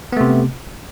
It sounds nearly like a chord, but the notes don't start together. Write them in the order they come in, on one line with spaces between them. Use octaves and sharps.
B3 A3 C3